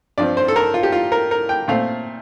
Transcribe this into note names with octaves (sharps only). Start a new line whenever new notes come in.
G2 F3 C4 D5
C5
A4
A#4
F4
G4
F4
A#4
A#4
G5
A#2 A3 C4 F5